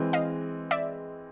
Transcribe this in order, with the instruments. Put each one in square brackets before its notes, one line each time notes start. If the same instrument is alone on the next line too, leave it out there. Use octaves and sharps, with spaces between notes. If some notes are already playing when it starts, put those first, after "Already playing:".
Already playing: [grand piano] E3 G#3 C4
[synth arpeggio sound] D#5 F5
D5 E5